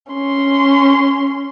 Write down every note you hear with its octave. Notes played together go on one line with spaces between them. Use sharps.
C#4 C6